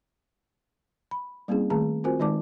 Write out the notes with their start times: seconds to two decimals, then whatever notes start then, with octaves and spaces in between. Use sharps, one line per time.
1.11 B5
1.48 G3 A#3 C4 C#4 E4 G#4
1.70 D#3 A3 G#4 A5 A#5
2.04 C4 F4 F#4 A#4 C5 G#5
2.19 D#3 G#3 D#4 D5 A5 D6